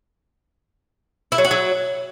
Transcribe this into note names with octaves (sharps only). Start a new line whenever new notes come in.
E4
F#3
F#4
F#3